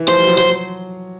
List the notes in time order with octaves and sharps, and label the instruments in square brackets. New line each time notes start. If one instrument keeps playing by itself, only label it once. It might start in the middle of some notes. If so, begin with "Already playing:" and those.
Already playing: [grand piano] E3
[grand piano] F3 [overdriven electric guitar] C5
[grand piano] G3
F#3
[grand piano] F#3 [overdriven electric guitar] C5
[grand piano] F#3